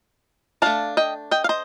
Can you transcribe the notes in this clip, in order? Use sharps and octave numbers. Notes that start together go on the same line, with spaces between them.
A3 D4 F5 A5
D#5 G5
D#5 G5
F5
C5 D#5